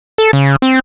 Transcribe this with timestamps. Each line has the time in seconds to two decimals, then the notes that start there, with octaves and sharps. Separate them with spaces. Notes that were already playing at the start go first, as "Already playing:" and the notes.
0.18 A4
0.33 C#3
0.62 C4